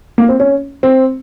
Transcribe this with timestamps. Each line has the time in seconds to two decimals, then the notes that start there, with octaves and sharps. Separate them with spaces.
0.18 A#3
0.29 C4
0.40 C#4
0.83 C4